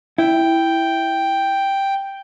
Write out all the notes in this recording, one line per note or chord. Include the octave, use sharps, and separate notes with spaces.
E4 G5